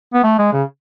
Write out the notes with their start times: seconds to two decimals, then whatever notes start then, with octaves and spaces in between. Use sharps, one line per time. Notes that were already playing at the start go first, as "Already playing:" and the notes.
0.14 B3
0.24 A3
0.39 G#3
0.53 C#3